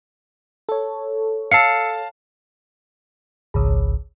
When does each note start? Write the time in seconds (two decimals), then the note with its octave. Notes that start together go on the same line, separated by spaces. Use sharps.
0.69 A4 C#5
1.51 F5 A5 E6 C7 C#7
3.54 G#1 C#2